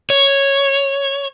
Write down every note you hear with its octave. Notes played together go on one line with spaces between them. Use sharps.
C#5